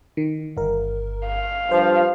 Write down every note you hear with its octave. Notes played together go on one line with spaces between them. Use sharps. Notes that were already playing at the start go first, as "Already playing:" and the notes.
D#3
G1 A#4
F5
G2 F3 C5